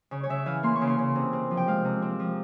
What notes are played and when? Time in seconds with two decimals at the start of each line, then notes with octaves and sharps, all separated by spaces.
0.11 C#3 C#5
0.23 C#5
0.29 C#3 E5
0.46 E3 F5
0.63 A#3 C6
0.76 C#6
0.81 C#3
0.87 C6
0.98 C#3
1.16 C3
1.33 C4
1.51 F3
1.57 G5
1.67 G#3 F5
1.85 C3
2.02 C4
2.19 F3